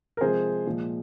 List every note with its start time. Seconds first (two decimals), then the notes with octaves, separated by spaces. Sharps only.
0.17 A#4
0.21 C3 F3 G#3 G#4 C5
0.67 A#2 F3 G#3